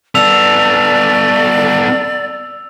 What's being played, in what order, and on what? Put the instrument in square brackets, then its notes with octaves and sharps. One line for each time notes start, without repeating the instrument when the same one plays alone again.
[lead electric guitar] B3 A4 [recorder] D5 [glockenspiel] E6 F7